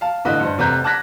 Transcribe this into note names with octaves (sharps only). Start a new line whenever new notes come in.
F5 A5
G1 A2 D3 B4 D#5
G2 C5
F1 C3 B4 A#5 G6
A5 D6 F#6 G#6 A#6 B6